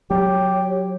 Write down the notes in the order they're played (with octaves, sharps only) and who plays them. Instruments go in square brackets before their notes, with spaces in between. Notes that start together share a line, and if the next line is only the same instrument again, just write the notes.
[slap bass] F#3 [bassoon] G4 [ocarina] C#5